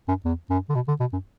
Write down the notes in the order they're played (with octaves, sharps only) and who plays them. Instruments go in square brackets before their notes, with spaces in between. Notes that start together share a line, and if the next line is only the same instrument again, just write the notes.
[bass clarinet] F#2
E2
F#2
D3
B2
D3
B2
F#2